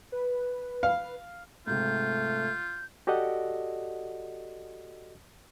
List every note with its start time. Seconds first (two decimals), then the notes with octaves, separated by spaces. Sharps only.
0.12 B4
0.83 F5
1.67 G#2 C3 A3 F4 G6
3.07 F#4 G4 A4 D5 D#5 F#5